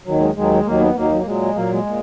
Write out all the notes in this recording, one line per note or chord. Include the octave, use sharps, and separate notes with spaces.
D#2 D#3 F#3
G#3
D#2 D#3 F#3 G#3
D#2 D#3 F#3 A#3
B3
D#2 D#3 F#3 A#3
F#3
A#3
A#2 F#3 G#3
A#2 F#3 A#3
G#3
A#2